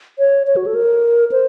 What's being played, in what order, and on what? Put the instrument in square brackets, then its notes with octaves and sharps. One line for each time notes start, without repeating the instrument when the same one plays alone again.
[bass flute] C#5
C#5
F#4
A4
A#4
C5